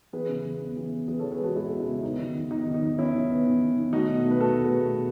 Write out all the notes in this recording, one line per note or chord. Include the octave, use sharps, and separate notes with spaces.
E3 G#4 B4
C#3
E3
B3
E3
B3
E3 G#4 B4
E3 A4 C#5
G#4 B4
G#3 F#4 A4
G#3 E4 G#4
G#3
C#4 E4
C#3
B3 D#4
D#3
D#3
D#3 D#4
D#3
D#4
D#3
D#3 C#4 E4
D#3
B3
D#3
D#3
D#3
A3 D#4 F#4
B2
A3
B4
A3 F#4 A4
A3
G#4 B4
A3
B2